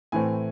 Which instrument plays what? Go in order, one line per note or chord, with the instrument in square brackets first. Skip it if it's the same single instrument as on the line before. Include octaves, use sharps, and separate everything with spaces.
[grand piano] A2 E3 A3 C4 G#5